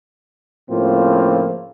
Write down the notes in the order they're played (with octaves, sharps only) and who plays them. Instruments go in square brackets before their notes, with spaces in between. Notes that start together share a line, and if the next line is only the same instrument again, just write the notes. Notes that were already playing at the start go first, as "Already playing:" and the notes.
[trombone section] A2 C#3 F3 A#3 C4 F4